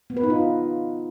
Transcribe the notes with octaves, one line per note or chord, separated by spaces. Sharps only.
B3
B4
D#4
F4